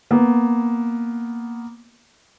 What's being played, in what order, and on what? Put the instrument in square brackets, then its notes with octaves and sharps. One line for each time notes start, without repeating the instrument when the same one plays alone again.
[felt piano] A#3 B3